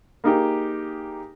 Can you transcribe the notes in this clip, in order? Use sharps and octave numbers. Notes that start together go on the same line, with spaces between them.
A#3 D#4 G4 G#4